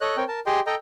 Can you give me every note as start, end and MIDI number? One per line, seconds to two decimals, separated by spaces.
0.01 0.17 69
0.01 0.17 73
0.01 0.17 75
0.01 0.17 90
0.17 0.24 60
0.17 0.24 70
0.17 0.24 73
0.17 0.24 79
0.28 0.40 70
0.28 0.40 81
0.46 0.60 67
0.46 0.60 68
0.46 0.60 75
0.46 0.60 79
0.46 0.60 84
0.67 0.75 69
0.67 0.75 75
0.67 0.75 79
0.67 0.75 82